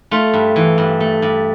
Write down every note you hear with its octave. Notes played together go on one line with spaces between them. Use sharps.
A3 F4
G2
E3
G2
A3
G2